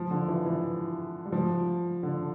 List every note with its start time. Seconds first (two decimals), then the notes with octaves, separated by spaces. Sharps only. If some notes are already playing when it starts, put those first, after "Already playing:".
Already playing: F3
0.11 D3
0.28 E3
0.46 E3
1.25 G3
1.32 F3
2.03 D3